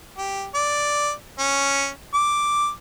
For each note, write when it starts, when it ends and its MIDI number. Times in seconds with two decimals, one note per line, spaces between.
0.17 0.46 67
0.55 1.11 74
1.39 1.89 61
2.14 2.70 86